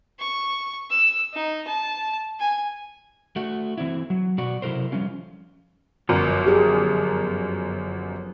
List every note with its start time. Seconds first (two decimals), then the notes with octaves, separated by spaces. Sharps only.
0.20 C#6
0.90 E6
1.34 D#4
1.67 A5
2.40 G#5
3.36 A3 F#4
3.78 E3 C4 E4
4.10 F#3
4.38 B2 F#4 D5 F#5
4.62 C3 F#3 E4 A4 A#4 C5
4.92 F3 G3 C#4 F4
6.09 G1 F#2 F3 F#3 B3 A#4
6.46 G4 G#4